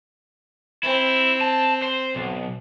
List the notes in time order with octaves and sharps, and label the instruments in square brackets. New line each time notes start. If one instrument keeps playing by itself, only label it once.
[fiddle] C4 [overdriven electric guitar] E4
[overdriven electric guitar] A5
C5
B1